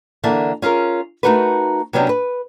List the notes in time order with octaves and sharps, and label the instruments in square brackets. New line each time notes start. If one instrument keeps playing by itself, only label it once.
[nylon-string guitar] D3 E3 A#3 E5 A5
C#4 F4 G#4 A#4
A3 A#3 D#4 F#4 A#4 B4
C3 F#3 B3 C#4 D4 G5
B4